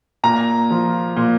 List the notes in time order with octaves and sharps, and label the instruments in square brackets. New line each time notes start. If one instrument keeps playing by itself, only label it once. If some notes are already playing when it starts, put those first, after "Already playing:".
[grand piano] A#2 A#5
F3
A#2